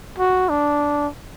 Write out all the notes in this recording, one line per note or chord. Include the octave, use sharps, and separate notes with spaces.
F#4
D4